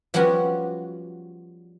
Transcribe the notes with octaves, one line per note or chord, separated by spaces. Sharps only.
F3 G3 B3 C#4 F#4